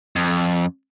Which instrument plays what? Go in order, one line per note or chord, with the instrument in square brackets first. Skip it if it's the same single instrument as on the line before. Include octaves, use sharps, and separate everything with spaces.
[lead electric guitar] F2